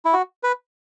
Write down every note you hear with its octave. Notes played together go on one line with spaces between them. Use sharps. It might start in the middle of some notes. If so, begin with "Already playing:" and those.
E4
F#4
B4